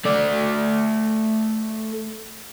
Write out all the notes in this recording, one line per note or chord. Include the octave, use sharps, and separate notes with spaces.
A3 D5